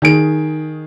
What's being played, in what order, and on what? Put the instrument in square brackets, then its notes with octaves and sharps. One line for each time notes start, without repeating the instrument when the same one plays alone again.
[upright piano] D#3 G#4 D7